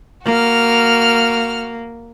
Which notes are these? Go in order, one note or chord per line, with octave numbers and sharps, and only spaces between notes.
A#3 F#4 F6